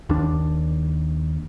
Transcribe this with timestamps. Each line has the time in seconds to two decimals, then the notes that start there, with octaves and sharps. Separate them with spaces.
0.09 D#2 D4